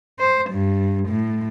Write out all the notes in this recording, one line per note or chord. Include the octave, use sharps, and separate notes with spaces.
C5
G2
A2